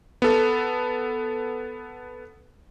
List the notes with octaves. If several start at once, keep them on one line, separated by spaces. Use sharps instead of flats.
B3 A4